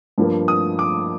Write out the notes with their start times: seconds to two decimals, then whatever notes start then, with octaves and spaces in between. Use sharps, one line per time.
0.18 G2 F3 A#3
0.48 D#6
0.79 D6